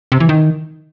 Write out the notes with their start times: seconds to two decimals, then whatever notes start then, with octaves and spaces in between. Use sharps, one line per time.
0.12 C3
0.20 E3
0.29 D#3